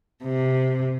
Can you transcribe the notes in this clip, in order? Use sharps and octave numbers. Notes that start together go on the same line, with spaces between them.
C3